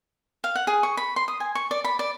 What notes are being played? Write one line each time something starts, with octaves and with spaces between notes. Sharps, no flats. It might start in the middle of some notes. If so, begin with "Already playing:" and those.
F5
F#5
G#4
C#6
B5
C6
D#6
G#5
C#6
D5
B5
D5